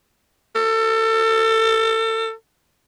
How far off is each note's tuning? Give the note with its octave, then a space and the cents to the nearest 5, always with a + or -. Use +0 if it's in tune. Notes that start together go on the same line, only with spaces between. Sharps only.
A4 +30